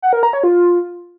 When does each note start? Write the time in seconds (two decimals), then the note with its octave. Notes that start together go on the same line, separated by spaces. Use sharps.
0.02 F#5
0.13 A#4
0.23 A#5
0.33 C#5
0.44 F4